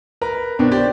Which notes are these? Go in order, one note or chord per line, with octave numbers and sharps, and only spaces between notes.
A#4 B4 A#5
B2 B3 C4 D4
G4 C5 D5